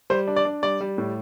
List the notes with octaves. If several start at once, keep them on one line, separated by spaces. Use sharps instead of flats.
G3 C5
D4
D5
D4
G3 D5
G3
A2